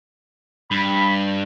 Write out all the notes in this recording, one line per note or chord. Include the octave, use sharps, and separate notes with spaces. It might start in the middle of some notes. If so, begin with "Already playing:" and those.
G2 B5